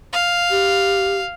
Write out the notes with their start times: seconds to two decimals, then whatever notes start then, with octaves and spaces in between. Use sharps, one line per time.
0.13 F5
0.51 G4